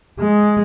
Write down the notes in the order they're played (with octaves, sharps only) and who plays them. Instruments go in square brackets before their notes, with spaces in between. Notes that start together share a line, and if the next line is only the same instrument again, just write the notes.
[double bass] G#3